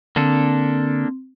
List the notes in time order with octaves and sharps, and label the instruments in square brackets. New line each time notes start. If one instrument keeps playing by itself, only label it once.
[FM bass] D3 [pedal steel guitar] A#3 D4 A4 [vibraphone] C4